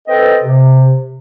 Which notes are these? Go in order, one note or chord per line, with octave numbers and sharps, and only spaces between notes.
C4 A4 B4 D#5 G5
C3